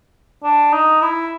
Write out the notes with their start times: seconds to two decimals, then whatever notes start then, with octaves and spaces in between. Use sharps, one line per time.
0.43 D4
0.73 D#4
1.01 E4